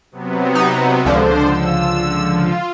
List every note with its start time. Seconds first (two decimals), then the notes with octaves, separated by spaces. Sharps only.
0.12 C3 F#3 B3
0.55 D#4
1.05 C#2 D3 F3 D4 C5
1.43 E6
2.30 F4